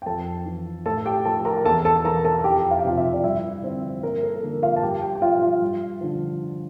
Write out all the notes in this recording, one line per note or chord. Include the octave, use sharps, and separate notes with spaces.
G5
F2 A4 A5
E3
A2 A4 A5
G4 G5
F3 A4 A5
A#4 A#5
E2 A4 A5
A4 A5
E3 A#4 A#5
A4 A5
A5
F2 G4 G5
F5
G5
C3 F3 F4 F5
E4 E5
D5
G2 E4 E5
D3 F3 C4 C5
G2 A#3 A#4
A4
A4
D3 F3 A#3 A#4
F4 F5
A5
G2 G4 G5
G4 G5
G5
F3 F4 F5
F4 F5
G2
D3 F3